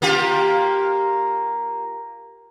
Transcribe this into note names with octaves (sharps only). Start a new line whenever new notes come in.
A#3 F4 G4